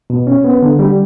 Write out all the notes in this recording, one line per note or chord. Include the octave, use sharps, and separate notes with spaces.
B2
C#4
B3
D3
G3